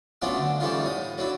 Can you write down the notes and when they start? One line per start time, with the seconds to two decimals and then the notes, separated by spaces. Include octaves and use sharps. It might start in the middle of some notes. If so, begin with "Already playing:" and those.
0.22 F#3 A3 B3 C#4 D4 F4
0.38 D3
0.60 E3 G3 A3 C#4 D#4 F4
0.85 A2 D#6
1.18 F#3 D4 E4